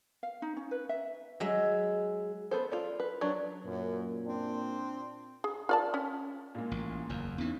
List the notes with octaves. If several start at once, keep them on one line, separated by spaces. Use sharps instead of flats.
F5
D#4
C#4
B4
E5
F#3 G#3 E5
B3 A4 C5
F4 A4 D5
B4
F#3 D4
F#2 A#2
C4 D4
G#4
F4 D5 A5
C#4
A#2 G#3 A#3
A1
F#1 E2
E2 E3 B3 C#4 D#4